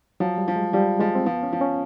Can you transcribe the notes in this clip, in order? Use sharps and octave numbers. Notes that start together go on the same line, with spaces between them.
F3 F#3
G3
F3
G#3
F3 G3
F3 G#3
C4
F3 B3
C#4
F3
C#4